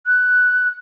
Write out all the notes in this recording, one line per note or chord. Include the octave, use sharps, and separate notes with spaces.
F#6